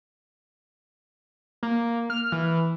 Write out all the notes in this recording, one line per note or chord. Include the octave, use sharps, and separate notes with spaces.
A#3
F6
E3